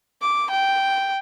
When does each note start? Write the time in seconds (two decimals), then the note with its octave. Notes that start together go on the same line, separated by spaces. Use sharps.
0.21 D6
0.50 G5